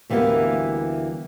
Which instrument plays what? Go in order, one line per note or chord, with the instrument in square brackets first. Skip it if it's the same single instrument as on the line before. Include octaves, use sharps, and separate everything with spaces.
[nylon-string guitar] D2 E3 G3 A#3 B3